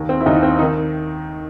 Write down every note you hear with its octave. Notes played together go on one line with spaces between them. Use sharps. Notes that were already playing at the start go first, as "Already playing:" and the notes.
Already playing: D#2 D#3
C4
E4
D#2 D#3 D#4
C4
D#4
D#3